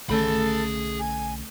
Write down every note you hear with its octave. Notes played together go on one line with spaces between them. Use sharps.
B1 D3 A3 C#4 G#4 A4 B5
G#5